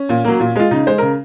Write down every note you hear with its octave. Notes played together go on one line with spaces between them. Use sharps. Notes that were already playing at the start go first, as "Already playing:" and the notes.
Already playing: C#4
A#2
F#3 A#3
A#2
G#3 F4
C#3 D#4
G#3 C5
C#3 A#4